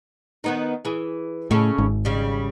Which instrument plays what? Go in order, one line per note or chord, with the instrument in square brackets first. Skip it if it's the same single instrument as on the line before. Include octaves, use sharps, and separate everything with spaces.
[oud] D#3 B3 D#4
E3 G#4
[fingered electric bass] A2 [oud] C#3 C#4 A4
[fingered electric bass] G#1
[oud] C#3 G3